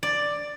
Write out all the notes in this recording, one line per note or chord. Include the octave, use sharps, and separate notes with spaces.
D5